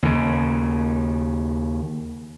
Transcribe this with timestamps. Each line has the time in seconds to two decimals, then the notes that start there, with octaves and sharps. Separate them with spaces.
0.03 D#2 C#3